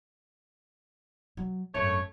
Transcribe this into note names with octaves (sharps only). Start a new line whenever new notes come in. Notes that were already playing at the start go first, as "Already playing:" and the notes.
F#3
G#1 F#2 A3 C#5